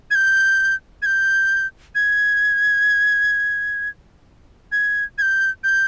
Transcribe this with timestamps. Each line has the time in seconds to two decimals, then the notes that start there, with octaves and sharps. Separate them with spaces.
0.11 G#6
0.15 G6
1.02 G#6
1.06 G6
1.95 G#6
4.72 G#6
5.18 G#6
5.22 G6
5.64 G6